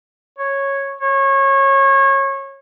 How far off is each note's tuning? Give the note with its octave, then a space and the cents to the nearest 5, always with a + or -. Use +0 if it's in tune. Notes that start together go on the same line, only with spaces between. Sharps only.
C#5 -10
C#5 -25